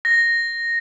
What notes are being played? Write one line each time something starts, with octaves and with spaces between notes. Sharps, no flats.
A#6